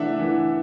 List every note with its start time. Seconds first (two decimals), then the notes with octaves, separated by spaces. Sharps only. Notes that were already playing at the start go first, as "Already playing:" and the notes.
Already playing: E3 A3 D4 E5 F#5
0.19 E3